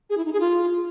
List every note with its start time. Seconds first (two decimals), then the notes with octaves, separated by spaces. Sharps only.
0.10 G#4
0.17 E4
0.25 D#4
0.33 G#4
0.40 F4